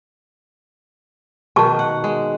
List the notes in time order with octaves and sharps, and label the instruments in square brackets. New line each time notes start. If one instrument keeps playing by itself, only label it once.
[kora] B2 D#3 [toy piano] A5 C#6
[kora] F#5
G#3